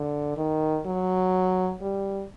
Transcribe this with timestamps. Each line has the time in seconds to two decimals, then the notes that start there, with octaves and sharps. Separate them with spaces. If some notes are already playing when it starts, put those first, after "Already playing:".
Already playing: D3
0.37 D#3
0.86 F#3
1.82 G3